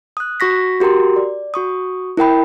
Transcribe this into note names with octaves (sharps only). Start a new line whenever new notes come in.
D#6 F#6
F#4 C#6 A#6 B6
F#4 G4 A#4 A#5 C6
D5
F#4 C#6 D#6
E4 A#4 G5 B5